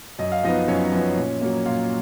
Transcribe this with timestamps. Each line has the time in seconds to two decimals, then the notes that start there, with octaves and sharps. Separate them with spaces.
0.19 F#2 D#5
0.32 F5
0.44 F3 B3 D#4 D#5
0.68 F#2 C#4 C#5
0.92 F3 B3
1.17 A#2
1.41 F#3 A#3
1.66 A#2 F4 F5